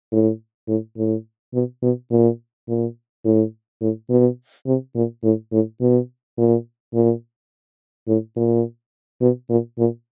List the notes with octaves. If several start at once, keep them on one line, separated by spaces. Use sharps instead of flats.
A2
A2
A2
B2
B2
A#2
A#2
A2
A2
B2
C3
A#2
A2
A2
B2
A#2
A#2
A2
A#2
B2
A#2
A#2